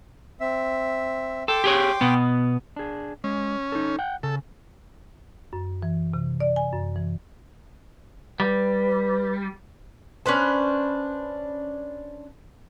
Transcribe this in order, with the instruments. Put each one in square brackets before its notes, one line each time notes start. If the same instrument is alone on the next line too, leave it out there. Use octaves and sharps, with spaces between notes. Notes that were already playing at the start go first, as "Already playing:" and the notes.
[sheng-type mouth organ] C4 E5
[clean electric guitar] A4 [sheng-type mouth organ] G5 C6 D6
[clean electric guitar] G4 G#4 C#5
B2 B3
[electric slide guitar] D4 G#4
[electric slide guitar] G#3 [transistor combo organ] C#4
[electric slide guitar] D#4 A4
F#5 G5
[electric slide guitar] C#3 [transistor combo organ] A4
[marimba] F#2
E3
C3
D5
G#5
F#2
E3
[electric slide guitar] G3 [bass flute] B4
[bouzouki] C#4 D4 B4 C5